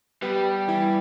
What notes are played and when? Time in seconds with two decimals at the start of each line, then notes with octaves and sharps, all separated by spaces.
0.22 G3 B3 B4
0.68 E3 E4